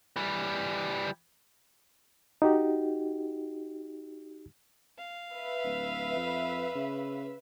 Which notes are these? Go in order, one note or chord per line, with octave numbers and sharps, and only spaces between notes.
E3 G3
D#4 F#4 G4
F5
B4 E5
D1
F2
C#3